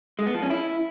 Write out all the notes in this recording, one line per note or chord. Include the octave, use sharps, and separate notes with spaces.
G#3
B3
F3
C#4
E4